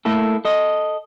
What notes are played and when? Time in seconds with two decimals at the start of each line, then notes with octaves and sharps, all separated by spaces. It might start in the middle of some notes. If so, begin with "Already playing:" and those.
0.05 A3 A#3 E4 A4
0.45 A4 D#5